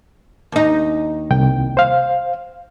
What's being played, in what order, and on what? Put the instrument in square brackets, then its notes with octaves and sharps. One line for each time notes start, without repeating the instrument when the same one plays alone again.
[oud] D#2 D#4
[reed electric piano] C2 G5
C5 F5